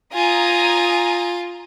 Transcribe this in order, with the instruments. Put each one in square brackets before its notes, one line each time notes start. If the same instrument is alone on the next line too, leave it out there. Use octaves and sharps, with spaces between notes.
[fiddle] F4 [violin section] G#5 A#5 D#6